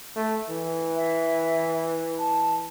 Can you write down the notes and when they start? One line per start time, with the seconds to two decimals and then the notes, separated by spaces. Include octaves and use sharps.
0.16 A3
0.49 E3
0.96 E5
2.19 A5